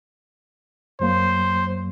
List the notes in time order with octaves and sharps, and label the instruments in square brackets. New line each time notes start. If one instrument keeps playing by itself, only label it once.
[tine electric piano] F#2 F#3 A#3 [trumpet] C5